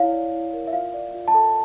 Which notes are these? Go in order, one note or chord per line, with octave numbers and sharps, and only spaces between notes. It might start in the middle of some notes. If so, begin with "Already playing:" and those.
Already playing: E4 C#5 F5
D5
E4
A#4
E5
F4 F5
D5
F4
A5
A4